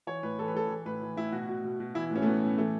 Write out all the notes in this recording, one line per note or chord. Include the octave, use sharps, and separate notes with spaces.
E3 C#5
A2 B4
E3 A4
B4
A2 A4
E3
A2 B4
E3
A2 E4
B2 F#4
B2
B2
B2
E3 E4
A2 C#4
A3
E3 B3
A2
E3 A3